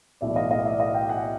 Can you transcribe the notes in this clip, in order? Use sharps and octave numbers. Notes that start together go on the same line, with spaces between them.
B1 A2 E3 D5 E5
D#5 F5
D#5 F5
D5 E5
D#5 F5
F5 G5
F#5 G#5